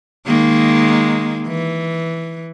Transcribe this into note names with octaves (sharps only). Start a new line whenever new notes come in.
D#3 G#3 A#3
E3